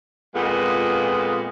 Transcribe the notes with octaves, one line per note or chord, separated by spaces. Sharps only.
F2 A#2 G#3 B3